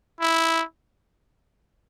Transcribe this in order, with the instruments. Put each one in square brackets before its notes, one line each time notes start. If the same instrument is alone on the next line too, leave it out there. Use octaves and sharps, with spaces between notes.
[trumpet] E4